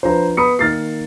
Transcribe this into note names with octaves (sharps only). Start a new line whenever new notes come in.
F3 D4 B4 C5 A#5
B3 B5 D#6 C#7
D#3 A#3 F6 A6 C7